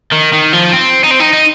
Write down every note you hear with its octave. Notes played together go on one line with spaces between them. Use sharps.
D#3
D#3
F3
C4
D#4
C4
D#4
D#4